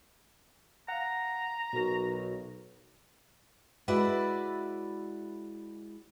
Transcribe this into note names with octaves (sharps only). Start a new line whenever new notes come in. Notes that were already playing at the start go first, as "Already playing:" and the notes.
F5 F#5 A#5
B1 B2 F#4 A#4
G#3 E4 F#4 B4 D5 E5